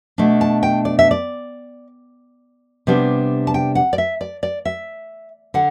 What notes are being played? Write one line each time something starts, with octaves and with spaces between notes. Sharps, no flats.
B2 A3 D4
A5
G5
D5
E5
D5
C3 G3 B3 D4
A5
G5
F#5
D5
E5
D5
D5
E5
D3 F#5